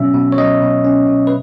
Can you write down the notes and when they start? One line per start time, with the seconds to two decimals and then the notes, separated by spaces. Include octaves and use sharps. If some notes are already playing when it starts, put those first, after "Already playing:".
Already playing: B2 F#3 C#4 E5
0.14 B2
0.32 C#5
0.37 F#3 D#5
0.62 B2
0.84 C#4
1.07 B2
1.27 B4